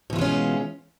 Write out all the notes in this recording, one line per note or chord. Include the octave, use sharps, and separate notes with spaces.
B2 E3 G#3 C#4 F4